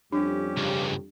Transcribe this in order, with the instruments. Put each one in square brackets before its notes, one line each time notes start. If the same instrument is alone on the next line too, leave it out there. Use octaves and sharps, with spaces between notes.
[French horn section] F2 G3 [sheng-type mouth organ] C#4 G4 [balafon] D4
[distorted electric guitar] C#2 G2